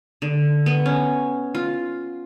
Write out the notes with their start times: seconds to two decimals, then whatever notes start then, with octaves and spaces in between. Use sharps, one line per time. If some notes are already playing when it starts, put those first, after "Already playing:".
0.22 D3
0.66 B3
0.86 C#4
1.55 F4